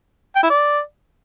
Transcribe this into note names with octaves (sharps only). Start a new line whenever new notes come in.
G5
E4
D5